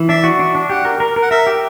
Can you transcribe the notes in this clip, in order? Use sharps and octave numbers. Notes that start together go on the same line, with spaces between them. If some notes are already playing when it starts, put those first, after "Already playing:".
Already playing: E3
D4 E5
F#4
D4
D4
G4 F#5
A#4
A#4
A#4
F#5
A#4 E5
G4